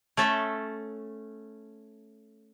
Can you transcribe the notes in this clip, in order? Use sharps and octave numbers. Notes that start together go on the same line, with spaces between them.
A3 C#4 A4 E5